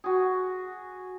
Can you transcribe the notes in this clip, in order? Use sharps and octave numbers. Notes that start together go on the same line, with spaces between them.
F#4 G#4